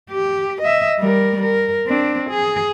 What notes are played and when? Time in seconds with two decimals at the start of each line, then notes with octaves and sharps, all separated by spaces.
0.11 G4
0.62 D#5 E5
0.99 G3 A#4
1.43 A#4
1.87 C4 D4
2.30 G#4